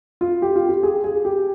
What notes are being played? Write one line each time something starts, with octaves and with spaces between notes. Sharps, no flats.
F4
G4
F4
G4
G#4
G#4
G4